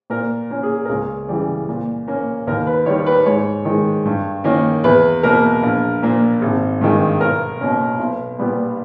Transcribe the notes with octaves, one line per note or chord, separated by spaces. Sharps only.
A#2 A#4
A#3 C#4
G#4
A#4
C#2 G#4
C#3 E3 G3
A#2
A#3 C#4
D#2 A#4
B4
D#3 G3 C#5
B4
G#2 C#5
D#3 G#3
G2
D#3 A#3 C#4
E2 B4
B2 A#3 A#4
A#1
A#2 A#3
G#1
G2 D#3 G#3
B1 A#4
B2 A#3 C#4
B1
A#2 G3 B3